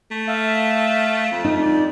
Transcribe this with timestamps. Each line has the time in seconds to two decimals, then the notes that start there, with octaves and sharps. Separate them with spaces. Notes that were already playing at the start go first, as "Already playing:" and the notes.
0.11 A3
0.28 E5 F5
1.31 F2
1.44 D#4
1.61 D5